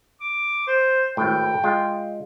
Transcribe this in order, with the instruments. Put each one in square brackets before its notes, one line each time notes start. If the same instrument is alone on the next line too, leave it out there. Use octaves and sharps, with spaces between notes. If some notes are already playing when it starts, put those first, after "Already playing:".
[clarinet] D6
C5
[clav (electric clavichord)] G#1 A2 [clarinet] G5
[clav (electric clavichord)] G#3 F4